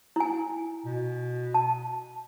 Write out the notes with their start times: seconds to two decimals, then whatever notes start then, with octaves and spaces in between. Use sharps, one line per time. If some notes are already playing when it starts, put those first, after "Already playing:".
0.16 E4 G#5
0.86 B2
1.54 A5